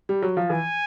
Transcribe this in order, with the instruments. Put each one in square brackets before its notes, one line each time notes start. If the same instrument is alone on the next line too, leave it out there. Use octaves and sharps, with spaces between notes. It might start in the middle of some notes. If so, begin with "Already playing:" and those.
[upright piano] G3
F#3
F3
[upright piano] E3 [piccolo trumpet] G#5